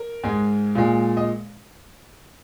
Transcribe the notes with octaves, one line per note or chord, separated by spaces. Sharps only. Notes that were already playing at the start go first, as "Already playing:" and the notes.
Already playing: A#4
G#2 G#3
A#2 G#3
D#5